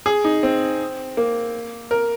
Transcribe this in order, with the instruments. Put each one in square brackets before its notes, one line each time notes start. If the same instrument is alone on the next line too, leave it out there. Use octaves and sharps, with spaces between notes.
[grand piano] G#4
D#4
C4
A#3
A#4